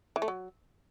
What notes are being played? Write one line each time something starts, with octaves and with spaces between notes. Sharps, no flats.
E3
A3
F#3